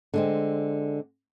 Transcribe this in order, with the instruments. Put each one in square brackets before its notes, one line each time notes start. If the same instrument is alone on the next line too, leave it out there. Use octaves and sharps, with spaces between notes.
[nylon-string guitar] D3 G#3 C4